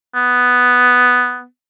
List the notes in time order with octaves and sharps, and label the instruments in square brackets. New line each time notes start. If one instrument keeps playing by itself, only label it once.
[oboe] B3